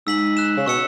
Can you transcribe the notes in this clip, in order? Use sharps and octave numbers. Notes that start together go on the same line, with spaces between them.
G#2 E6 B6 F#7
F#6 E7
C#3
B2 C#6 E6 C#7 E7